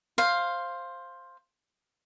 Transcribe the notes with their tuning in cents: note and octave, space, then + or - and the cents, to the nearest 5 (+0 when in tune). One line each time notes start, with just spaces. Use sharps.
C5 +10 F5 +0